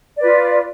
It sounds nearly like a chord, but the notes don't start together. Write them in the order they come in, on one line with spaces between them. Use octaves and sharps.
D5 B4 F4